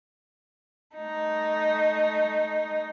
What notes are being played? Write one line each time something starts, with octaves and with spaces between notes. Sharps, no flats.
A3 D#4